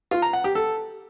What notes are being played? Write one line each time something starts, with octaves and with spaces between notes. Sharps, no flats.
F4
A#5
F#5
G4
A4